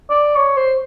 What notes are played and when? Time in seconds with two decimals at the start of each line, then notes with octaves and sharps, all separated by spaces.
0.10 D5
0.36 C#5
0.57 C5